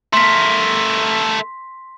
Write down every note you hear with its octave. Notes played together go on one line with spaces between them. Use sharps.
A3 A#4 C6 B6